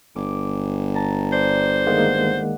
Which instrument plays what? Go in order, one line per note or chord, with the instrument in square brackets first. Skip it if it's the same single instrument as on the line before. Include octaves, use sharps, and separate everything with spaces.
[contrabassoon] G1 [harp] D6
[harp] A5 A#5
[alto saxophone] C5 [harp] D5
[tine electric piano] D#3 G#3 A#3 [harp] F#5